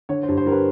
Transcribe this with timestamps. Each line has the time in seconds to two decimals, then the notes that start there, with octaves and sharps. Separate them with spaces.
0.09 D3 C#5
0.23 C5
0.28 G2
0.37 C5
0.46 G3 A#4
0.52 B4